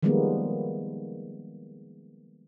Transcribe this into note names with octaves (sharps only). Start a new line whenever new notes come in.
D#3 F3 G3 G#3 A#3 B3